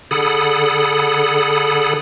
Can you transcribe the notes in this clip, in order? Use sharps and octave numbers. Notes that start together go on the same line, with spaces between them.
D3 G#4 A4 F#5 B5 D#6